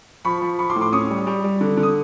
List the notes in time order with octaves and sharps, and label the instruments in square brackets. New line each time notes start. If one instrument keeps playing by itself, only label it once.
[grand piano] F3 B5 C#6
F3
F3 B5 C#6
C6 D6
A2
C6 D6
C#4 C#6 D#6
G3
G3
G3
D3
D3
D#6